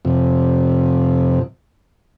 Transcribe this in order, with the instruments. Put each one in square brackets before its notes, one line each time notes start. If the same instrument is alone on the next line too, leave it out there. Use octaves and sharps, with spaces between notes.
[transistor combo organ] F2 C3